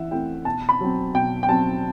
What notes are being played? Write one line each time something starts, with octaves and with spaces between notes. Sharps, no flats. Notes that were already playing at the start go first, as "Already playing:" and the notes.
Already playing: E3 E5 F#5
A3 C4 E4 G5
B2 A5
B5
F#3 C4
B2 G5
G5
F#3 C4 A5